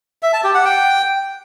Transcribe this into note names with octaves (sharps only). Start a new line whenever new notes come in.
E5
A5
G4
F#5
G5